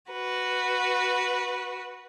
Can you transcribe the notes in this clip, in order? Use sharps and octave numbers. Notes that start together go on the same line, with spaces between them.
F#4 B4